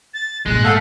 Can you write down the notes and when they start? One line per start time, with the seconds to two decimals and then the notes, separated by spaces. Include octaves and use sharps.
0.14 A6
0.46 G#1 A#2 G#3 F#6
0.64 A3 A4 F5 F#5